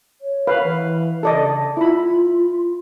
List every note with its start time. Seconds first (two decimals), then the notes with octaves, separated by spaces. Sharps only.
0.21 C#5
0.47 B4 F5
0.63 E3
1.23 C#3 A4 D5 D#5
1.77 E4 F4 B5